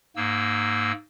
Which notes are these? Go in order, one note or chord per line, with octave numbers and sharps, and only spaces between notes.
G#2 A#3 E6